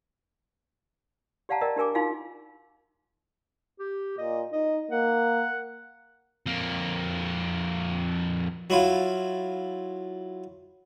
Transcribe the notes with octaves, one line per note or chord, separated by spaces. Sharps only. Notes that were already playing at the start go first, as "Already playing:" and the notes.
G4 D5 F5 F#5 A5 A#5
A#4 D5 D#5 G5
D4 G4 A#4 G#5 D6
D#4 F4 F#4 F5 G#5
G4
A#2 D#5
D#4 D#5
A#3 F#5
F2 A#3
F#3 E4 F4